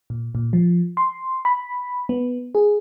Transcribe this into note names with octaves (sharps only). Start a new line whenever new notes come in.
A#2
A#2
F3
C6
B5
B3
G#4